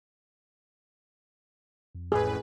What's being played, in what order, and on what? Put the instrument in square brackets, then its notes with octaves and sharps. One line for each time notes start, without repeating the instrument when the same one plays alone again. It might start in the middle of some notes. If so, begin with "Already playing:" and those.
[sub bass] F2
[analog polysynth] A1 A2 B4 [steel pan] G#4